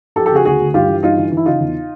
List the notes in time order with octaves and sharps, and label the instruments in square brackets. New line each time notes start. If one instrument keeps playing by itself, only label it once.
[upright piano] F3 G4 A4
G4 A4
C#3 F#4 G#4
D2 F#4 G#4
D2
G2 F4 G4
E3
G2 D#4 F4
E3
E3
E4
C#3 D#4 F4
E2